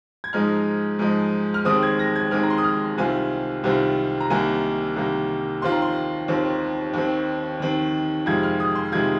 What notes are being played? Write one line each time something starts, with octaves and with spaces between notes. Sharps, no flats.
G#6
G#2 F3 G#3 D#4 F6
G#2 F3 G#3 D#4
F6
D#2 D#3 G#3 C4 D#6
G#6
A#6
G#6
D#2 D#3 G#3 C4 F6
A#5
C6
D#6
F6
C2 C3 D#3 C4 F4 G#5
C2 C3 D#3 C4 F4
A#5
C2 C3 D#3 A#3 G#5
C2 C3 D#3 A#3
D#2 D#3 C4 F4 C6
A#5
C6
D#2 D#3 C4 F4
D#2 D#3 C4
D#2 D#3 C4
F2 C3 D#3 G#3 F4 G#6
F6
D#6
C6
C3 D#3 G#3 F4 G#6